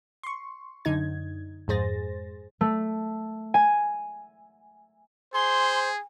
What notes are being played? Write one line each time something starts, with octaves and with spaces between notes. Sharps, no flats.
C6 C#6
F#2 D3 D#4 G#6
F2 G#2 G#4 C5 A6 A#6
A3
G#5
G#4 C5 G#5 C6